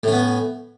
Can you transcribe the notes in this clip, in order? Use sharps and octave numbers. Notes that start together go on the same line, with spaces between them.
A2 B3 C#4